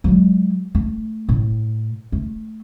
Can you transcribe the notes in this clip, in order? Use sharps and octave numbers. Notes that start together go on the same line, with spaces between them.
F#3 G#3
A3
A2
A3